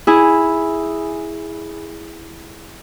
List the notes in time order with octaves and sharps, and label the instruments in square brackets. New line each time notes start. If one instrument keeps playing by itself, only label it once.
[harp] E4 G#4